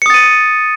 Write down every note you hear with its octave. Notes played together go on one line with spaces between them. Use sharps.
D#6 A6 C#7 D#7